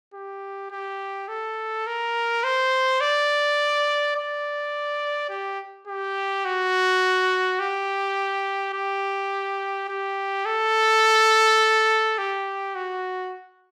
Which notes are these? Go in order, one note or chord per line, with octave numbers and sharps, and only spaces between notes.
G4
G4
A4
A#4
C5
D5
D5
G4
G4
F#4
G4
G4
G4
A4
G4
F#4